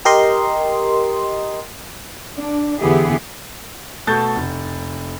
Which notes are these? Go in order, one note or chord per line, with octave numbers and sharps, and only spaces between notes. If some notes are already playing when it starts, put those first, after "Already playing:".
G4 A#4 D#5 C6
D4
E2 D3 B3 E4 G4 G#4
B2 A3 A4 A5 G6 A6
F1